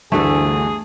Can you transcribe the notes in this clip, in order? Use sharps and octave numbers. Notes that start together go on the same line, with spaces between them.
G1 D2 G2 E3 A3 G#4 A4